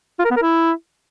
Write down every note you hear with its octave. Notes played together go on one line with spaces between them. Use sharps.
F4
A#4
B3
A#4
E4